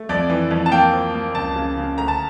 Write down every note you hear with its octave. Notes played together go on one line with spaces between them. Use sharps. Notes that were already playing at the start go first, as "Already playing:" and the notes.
Already playing: A3
F2 D5
E3
F2
A5
A#3 G5
F3
A#3
C#2 A5
C#3
C#3
D2 A#5
A5